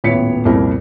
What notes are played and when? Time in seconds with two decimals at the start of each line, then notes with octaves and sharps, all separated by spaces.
0.04 D#1 A1 B3 C#5 B6 C#7
0.45 C2 F2 A#2 E4 A#4